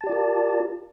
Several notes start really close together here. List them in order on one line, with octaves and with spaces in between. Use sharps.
A5 G4 D5 F4 A#4